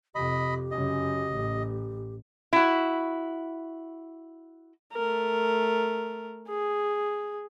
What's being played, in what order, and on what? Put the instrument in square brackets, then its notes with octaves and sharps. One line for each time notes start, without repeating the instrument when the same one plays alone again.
[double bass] F2 C3 [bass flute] G4 [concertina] D#5 B5
[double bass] F#2 C#3 [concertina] D#5
[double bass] A1
[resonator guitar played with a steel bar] E4 F#4
[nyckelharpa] A3 A#4
G#4